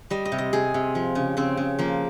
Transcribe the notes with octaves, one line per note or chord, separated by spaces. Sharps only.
G3 D#5
D#5
C3
D#5
C3 G#4
C3
F3
C#3
C#3 C4
C#3
F3 A#3